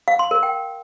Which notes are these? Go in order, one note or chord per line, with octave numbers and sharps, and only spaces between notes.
F5
C6
A#4
G5